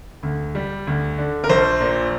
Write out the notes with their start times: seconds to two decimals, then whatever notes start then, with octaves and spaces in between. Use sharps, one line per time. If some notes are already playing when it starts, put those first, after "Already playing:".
0.23 D2
0.55 G3
0.87 D2
1.18 D3
1.44 A#4
1.49 A#1 C5
1.81 A#2